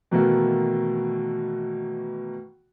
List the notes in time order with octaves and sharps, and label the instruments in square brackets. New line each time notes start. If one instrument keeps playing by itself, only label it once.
[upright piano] B2 D#3 E3 A3 A#3 F#4